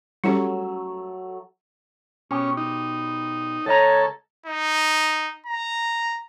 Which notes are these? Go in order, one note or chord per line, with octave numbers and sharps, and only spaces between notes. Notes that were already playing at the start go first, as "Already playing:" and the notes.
F#3 G3 A3 C#4 E4 G4 E6
B2 C#4 G4
D#4
C#2 A4 C#5 D#5 A#5
D#4
A#5